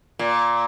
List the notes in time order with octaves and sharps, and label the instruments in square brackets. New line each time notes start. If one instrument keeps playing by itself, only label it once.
[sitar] A#2